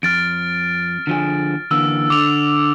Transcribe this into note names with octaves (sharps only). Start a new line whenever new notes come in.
F2 F6 A6 D7
D3 F3 G#4
D3 E3 A#3 E6
D3 D6 F7